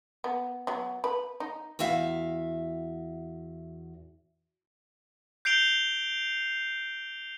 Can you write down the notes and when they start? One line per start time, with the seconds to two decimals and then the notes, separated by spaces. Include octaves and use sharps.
0.24 B3
0.67 F#3 B3
1.04 B4
1.40 D#4
1.79 E2 F#4 E5 F5
5.45 G6 C7 D7 F7 G7